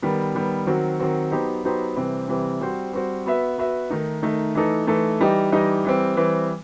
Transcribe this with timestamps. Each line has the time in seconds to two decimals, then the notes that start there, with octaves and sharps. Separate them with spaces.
0.02 D#3 G3 B3
0.35 D#3 G3 B3
0.67 D#3 F#3 C4 F#4
0.99 D#3 F#3 C4 F#4
1.31 F#3 B3 D#4 G4 C5
1.64 F#3 B3 D#4 G4 C5
1.96 C3 E3 G3 C4
2.28 C3 E3 G3 C4
2.61 G3 C4 F#4 C5
2.93 G3 C4 F#4 C5
3.26 B3 F#4 B4 E5
3.58 B3 F#4 B4 E5
3.90 D#3 A3 D#4
4.23 D#3 A3 D#4
4.55 E3 A3 D#4 A4
4.87 E3 A3 D#4 A4
5.20 E3 G3 D#4 G4 D#5
5.52 E3 G3 D#4 G4 D#5
5.85 E3 G3 C4
6.17 E3 G3 C4